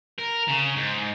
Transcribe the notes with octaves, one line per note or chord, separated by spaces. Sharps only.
A#4
C#3
G#2